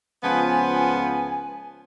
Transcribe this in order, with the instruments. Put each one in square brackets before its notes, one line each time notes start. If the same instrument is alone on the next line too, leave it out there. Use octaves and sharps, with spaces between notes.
[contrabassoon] C#2 [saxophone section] F3 B3 [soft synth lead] G#5